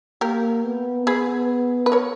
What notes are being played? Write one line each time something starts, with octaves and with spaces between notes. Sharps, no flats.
A#3 G4 A#4
B3
B3 G#4 B4
B4
A#4 C#5